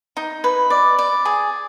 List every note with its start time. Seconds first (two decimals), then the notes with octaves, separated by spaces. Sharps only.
0.17 D#4
0.44 B4
0.70 D5
0.99 D5
1.25 G#4